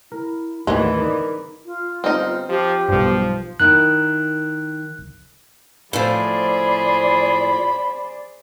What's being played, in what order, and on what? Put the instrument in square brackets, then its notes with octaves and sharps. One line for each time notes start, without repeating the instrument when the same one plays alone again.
[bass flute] E4 [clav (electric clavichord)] A#4
[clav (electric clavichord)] D#2 A2 A3 [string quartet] D3 E3 [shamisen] G#3 C#4 [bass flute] A#4
[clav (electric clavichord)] D#4 D5 [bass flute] A#4
[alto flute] F4
[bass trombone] G1 [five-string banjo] C4 D#4
[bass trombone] F3 [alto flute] G4
[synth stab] B1 G2 [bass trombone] F3
[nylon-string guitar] D#3 D#4 E4 [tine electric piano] F#6
[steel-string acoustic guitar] A2 F3 [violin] G#4 C5 [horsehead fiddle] D5 [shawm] B5